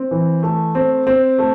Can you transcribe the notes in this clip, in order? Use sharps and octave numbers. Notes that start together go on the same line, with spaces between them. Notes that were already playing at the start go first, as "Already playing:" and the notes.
Already playing: C4
E3
A3
C4
C4
A3